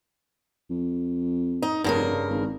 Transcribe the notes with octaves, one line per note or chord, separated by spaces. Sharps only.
F2
D#4
F1 G2 C#3 A#4
G#1